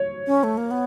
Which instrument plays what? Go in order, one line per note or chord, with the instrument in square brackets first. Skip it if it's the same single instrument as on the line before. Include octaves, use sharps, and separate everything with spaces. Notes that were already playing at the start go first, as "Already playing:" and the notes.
Already playing: [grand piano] C#5
[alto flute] C#4
A3
A#3
B3